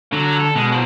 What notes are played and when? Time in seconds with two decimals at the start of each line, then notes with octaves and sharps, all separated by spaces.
0.13 D3 F#3
0.40 A4
0.55 B2 G#3
0.72 F#3 C5